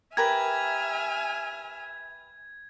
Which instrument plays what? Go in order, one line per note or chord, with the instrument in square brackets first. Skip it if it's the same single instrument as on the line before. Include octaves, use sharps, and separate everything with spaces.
[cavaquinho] G4 A#4 B4 [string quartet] E5 G#5 F6 [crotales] G#6